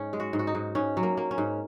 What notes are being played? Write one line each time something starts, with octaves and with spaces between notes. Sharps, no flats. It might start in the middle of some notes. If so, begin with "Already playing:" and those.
Already playing: G#2 C#4 D#4
G#3
F#4
G#2
F#4
D#4
G#2
G#2 C#4
F#3
A#3
A#3
C#4
G#2